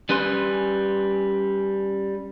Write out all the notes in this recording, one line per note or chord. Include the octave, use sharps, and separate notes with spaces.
G3 C#4 B4 G#5 C6